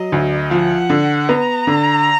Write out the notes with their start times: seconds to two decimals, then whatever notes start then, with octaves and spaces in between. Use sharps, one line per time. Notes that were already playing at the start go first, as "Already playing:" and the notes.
Already playing: F#3 D#5
0.12 D2
0.51 F3 F#5
0.90 D3
1.29 B3 A#5
1.67 D3